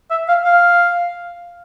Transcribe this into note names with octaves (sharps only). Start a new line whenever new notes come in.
E5
F5
F5